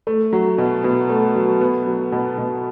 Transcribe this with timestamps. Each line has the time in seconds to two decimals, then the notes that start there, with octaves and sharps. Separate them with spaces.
0.07 A3
0.33 F#3
0.58 B2
0.84 B2
1.09 A3
1.35 F#3
1.61 B3
1.87 F#3
2.12 B2
2.38 B2